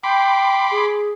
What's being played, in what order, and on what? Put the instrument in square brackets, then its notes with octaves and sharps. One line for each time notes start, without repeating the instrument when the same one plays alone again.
[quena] G5 [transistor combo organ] B5 C6 D6
[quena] G#4